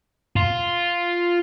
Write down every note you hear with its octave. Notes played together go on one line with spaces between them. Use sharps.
F4